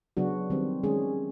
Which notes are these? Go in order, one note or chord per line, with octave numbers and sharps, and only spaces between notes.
C#3 F#3 B3 D4 F#4
D#3 G3 C4
D#3 G#3 C#4 G#4